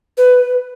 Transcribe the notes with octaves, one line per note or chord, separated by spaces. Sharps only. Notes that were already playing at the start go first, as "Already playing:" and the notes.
B4